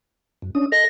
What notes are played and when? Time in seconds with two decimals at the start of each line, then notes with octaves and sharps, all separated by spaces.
0.42 F#2
0.55 C#4 D4 D#6
0.72 A4 D#5 A#6